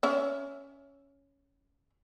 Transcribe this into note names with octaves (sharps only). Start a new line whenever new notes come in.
C#4 E5